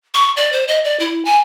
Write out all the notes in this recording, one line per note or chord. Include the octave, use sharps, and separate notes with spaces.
C#6
D5
C5
D#5
D5
E4
G#5